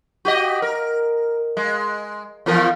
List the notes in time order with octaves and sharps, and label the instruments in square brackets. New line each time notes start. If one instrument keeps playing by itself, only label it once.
[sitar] F#4 G4 D#5
A#4
G#3
E2 F3 A#4